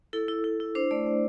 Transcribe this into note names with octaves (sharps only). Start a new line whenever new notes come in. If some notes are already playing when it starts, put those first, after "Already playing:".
E4 A4
E4
E4
E4
D4 C5
A3 D5
A3